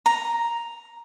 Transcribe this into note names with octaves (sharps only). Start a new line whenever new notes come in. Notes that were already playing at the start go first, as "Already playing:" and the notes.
A#5